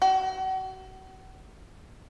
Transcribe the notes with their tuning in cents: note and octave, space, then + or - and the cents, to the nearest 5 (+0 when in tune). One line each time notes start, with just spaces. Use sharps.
F#4 +35